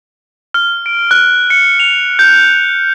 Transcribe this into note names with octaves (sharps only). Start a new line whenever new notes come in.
F6
D7
F#6
C#7
F7
G6